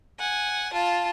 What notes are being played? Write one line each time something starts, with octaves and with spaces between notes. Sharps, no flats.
F#5 G#5
F4 A5